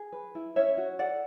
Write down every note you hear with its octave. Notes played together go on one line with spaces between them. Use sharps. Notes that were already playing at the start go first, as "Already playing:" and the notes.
Already playing: G#4
B4
E4
C#4 C#5 E5
F#4
A4 D5 F#5